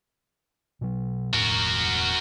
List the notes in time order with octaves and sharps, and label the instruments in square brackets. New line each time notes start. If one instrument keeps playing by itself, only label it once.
[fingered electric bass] B2 F#3
[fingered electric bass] E1 A2 [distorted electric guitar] F#4 A#4